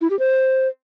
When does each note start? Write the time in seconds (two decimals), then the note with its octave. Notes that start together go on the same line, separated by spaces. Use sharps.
0.01 E4
0.10 G4
0.19 C5